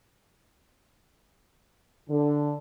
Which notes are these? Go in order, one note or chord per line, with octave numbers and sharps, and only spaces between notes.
D3